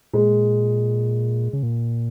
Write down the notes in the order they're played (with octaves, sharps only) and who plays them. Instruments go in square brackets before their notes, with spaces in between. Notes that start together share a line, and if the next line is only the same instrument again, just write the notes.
[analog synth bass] A#2 [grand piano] G#3
[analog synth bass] C#3
A#2